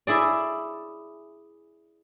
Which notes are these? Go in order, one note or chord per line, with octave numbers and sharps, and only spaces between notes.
E4 G#4 D5